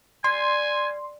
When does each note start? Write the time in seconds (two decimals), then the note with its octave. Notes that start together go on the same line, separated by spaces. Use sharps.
0.24 G3 G#5 C6